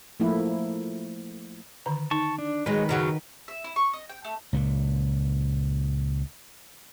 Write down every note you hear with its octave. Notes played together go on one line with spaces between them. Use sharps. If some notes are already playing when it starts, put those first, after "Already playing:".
F3 A3 A#3 E4
D3 D#3 A#5
D#4 A5 C#6
D4
D#3 F#3 G#3 B4
F#2 C#3 F#3 D#5 F#5
E5
E4
C#6
D#5
G5
A3
C#2 A#2